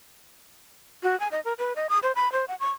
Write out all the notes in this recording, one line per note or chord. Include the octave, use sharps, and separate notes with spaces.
F#4
G#5
D#5
A#4
B4
D#5
D#6
C5
B5
C5
F#5
C#6